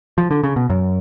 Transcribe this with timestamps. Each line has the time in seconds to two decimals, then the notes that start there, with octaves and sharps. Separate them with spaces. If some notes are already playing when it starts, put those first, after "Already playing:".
0.18 F3
0.31 D3
0.43 C#3
0.56 B2
0.70 F#2